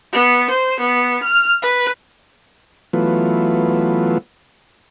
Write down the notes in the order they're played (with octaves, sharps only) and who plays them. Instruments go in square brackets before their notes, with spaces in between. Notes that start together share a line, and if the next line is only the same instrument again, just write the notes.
[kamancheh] B3
C5
B3
F6
B4
[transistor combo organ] E3 F#3 A3 B3 F4